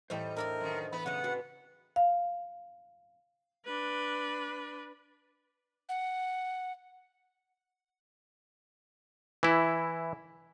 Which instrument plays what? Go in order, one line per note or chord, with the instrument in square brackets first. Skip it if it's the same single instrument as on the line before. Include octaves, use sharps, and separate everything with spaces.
[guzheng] E2 A2 B5 [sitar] G3 [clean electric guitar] C5 D#5 G5
[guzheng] D4 E4 A4 [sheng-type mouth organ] A#4
[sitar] F#2 D#3
[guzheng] E3 [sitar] B3 [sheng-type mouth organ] B5
[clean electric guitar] B1 [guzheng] C#3 D#5 [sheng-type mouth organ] F#5
[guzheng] C4 [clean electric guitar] F#4 B4
[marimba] F5
[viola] D4 B4
[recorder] F#5
[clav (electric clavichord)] E3 E4